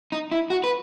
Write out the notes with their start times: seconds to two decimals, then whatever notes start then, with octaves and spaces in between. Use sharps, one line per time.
0.12 D#4
0.32 E4
0.50 F#4
0.64 B4